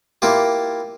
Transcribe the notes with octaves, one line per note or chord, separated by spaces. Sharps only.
A#3 E4 F4 G4